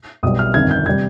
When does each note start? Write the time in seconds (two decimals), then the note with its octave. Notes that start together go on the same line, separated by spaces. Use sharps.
0.23 B1 B2 G3 D#6
0.39 F6
0.54 G1 F2 D#3 G#6
0.71 G6
0.86 C3 G3 G#6